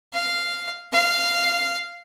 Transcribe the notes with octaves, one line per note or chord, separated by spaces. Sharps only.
F5
F5